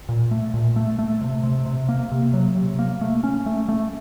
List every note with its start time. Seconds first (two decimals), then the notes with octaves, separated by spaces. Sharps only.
0.09 A#2
0.31 A3
0.54 A#2
0.76 A3
0.99 A3
1.21 C3
1.43 C3
1.66 C3
1.89 A#3
2.12 C3
2.33 F#3
2.56 C3
2.79 A#3
3.01 A3
3.24 C#4
3.46 A3
3.69 A3